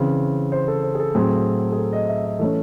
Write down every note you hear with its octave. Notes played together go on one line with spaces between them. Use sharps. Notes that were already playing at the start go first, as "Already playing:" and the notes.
Already playing: C#3 E3 C4
C5
A4
C5
G#4
A4
A2 F#3 A3 C4 G#4
G#4
A4
D#5
E5
D#5
E3 A3 C#4 A4